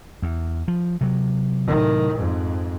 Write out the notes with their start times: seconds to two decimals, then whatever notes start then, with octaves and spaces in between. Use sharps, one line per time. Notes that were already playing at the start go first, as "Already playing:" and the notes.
0.22 E2
0.68 F3
1.01 C3 F#3
1.67 A2 D#3
2.15 F2 G#2